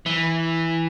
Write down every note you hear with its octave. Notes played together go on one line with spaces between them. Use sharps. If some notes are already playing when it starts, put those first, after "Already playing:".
E3